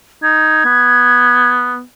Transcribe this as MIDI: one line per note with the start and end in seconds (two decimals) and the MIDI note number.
0.23 0.63 63
0.23 1.49 92
0.65 1.82 59